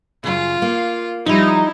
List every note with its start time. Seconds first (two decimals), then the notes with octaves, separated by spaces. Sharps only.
0.24 F#2 C#3 F4
0.62 A#3
1.26 F3 G3 D#4 E4